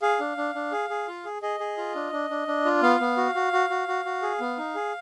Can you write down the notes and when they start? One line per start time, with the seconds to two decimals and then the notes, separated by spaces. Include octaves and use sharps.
0.02 G#4 F5
0.20 D4
0.37 D4
0.55 D4
0.72 G#4
0.90 G#4
1.08 F4
1.25 G#4
1.42 G#4 D#5
1.60 G#4
1.77 F4
1.95 D4
2.12 D4
2.30 D4
2.48 D4
2.65 F4
2.82 B3 F5
3.00 B3
3.17 F#4
3.35 F#4
3.53 F#4
3.70 F#4
3.88 F#4
4.05 F#4
4.22 G#4
4.40 B3
4.58 D#4
4.75 G#4